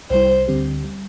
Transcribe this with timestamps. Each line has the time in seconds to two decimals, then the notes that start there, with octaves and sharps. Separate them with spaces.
0.10 C2 C3 G3 E4 C5
0.48 D2 D3 G3 C4 G4
0.85 G3